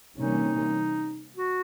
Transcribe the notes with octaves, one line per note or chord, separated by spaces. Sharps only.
C3 E3 G3 A#3 C#4 D#4
F#4